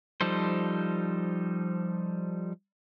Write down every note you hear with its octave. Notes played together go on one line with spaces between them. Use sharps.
F3 G3 D#4 A4 C5